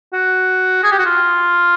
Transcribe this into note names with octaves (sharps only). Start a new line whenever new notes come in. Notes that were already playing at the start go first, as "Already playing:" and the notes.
F#4
G#4
G4
F#4
F4